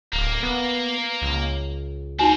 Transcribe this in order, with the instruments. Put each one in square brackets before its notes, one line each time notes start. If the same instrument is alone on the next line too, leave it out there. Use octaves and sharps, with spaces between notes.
[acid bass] D1 [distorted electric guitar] A#3
[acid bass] B3
C#2
[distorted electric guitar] C4 C#4 [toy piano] D#4 F#4 G#5